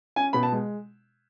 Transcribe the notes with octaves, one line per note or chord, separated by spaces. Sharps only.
C#4 G#5
B2 B5
A5
G#3